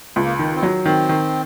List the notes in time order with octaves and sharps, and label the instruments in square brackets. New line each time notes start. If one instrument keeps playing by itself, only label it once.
[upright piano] C#2
[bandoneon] A#3
[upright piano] D#3
[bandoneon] C4
[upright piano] F#3
[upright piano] D#3 [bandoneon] C4
[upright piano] D#3